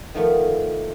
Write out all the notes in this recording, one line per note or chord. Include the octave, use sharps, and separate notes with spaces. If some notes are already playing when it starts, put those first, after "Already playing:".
D#3 F3 A3 B3